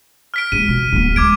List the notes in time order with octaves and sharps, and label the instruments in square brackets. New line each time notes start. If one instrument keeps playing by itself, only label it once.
[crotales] F6 B6 D7
[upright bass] G#3 F4 [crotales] D#7
[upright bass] B2
D1 B3
[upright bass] D2 G#3 [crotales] D6 G#6 D7